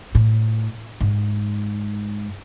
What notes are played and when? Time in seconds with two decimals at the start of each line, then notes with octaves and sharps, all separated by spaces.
0.15 A2
1.01 G#2